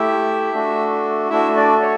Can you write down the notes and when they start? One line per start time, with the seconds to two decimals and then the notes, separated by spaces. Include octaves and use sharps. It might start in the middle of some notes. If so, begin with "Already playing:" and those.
Already playing: A3 E4 G4 E5
0.53 A3 D4 F#4
1.30 A3 D4 E4 F#4 E5
1.56 D4 D5
1.82 C#5